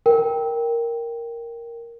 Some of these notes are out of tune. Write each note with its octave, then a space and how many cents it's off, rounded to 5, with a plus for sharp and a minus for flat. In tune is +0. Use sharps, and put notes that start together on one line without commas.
A#4 +0 G5 +0